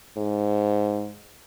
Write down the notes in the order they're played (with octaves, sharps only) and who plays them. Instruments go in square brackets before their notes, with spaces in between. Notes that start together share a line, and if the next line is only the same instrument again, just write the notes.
[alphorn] G#2